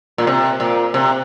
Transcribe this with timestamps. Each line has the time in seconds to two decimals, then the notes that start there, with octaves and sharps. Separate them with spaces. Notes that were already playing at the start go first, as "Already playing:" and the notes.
0.18 A#2
0.27 C3
0.60 A#2
0.94 C3